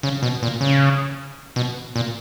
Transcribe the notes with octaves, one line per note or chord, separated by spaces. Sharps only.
C#3
B2
A#2
C#3
B2
A#2